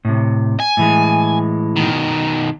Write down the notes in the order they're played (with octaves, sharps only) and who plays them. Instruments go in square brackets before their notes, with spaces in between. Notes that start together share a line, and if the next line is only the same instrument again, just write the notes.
[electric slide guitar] A2 C3
[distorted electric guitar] G#5
[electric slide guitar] A2 E3 G#3
[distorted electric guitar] B2 D#3